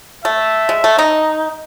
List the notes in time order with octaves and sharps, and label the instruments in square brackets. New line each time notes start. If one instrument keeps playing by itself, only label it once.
[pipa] A3 [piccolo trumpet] E5
[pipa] G#3
A3
D#4